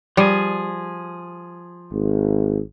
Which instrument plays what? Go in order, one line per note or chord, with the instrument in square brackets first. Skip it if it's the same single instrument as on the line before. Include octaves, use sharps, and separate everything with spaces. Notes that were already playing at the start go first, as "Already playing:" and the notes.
[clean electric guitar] F3 G#4 [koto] G3
[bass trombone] G#1